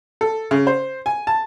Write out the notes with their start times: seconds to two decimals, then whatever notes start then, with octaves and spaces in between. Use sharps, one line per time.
0.21 A4
0.51 C#3
0.67 C5
1.06 G#5
1.27 A5